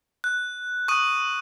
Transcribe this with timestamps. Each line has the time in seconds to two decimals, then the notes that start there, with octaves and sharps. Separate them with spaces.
0.24 F#6
0.88 C#6 D#6 F#6 D#7